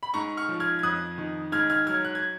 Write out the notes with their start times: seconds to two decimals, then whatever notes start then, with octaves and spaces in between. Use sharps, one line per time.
0.03 B5
0.14 G#2 A#5 C#6
0.37 C#6 F6
0.49 F3
0.60 F6 G#6
0.79 G#6
0.83 F2 D#6 F#6
1.18 D#3
1.52 G#2 F6 G#6
1.70 F6 G#6
1.87 F#3 F6 G#6
2.05 F#6
2.15 G#6